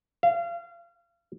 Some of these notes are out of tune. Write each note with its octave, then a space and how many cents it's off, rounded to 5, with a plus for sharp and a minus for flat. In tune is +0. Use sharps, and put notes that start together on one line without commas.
F5 -30